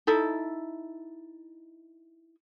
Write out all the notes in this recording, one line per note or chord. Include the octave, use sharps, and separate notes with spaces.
D#4 E4 A4